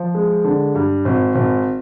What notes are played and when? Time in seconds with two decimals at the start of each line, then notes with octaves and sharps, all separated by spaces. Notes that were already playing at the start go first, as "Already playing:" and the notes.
Already playing: F3
0.15 G#3
0.44 D3
0.75 G2
1.05 G#1
1.35 G#1